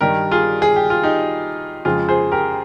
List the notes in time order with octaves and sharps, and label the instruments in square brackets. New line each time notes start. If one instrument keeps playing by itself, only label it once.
[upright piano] G2 D#3 G3 G4 A#4
F4 G#4
G#4
G4
F4
D#4 G4
F2 C#3 F3 G#3 F4 G#4
G#4 C5
G4 A#4